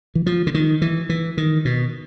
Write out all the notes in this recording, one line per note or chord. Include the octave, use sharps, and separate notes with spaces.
E3
F3
D3
D#3
E3
E3
D#3
B2